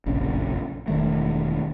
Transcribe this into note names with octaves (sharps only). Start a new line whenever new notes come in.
F1 A#1 F#2 C#3
E1 D#3 A3